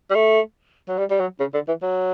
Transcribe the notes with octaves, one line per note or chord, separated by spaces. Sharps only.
G3
A3
F#3
G3
G3
F#3
C#3
D3
E3
F#3